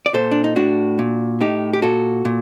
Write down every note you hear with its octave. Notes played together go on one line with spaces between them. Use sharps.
D5
A#2 A4 C5
D4
D#4
A2 D4 F#4
A#2
A2 D#4 G4
G4
A#2 F#4 A4
A#2